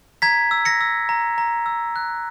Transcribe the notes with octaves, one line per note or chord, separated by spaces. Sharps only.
A#5 G#6 B6
E6
A#6 C#7
E6
A#5
A#5
E6
F#6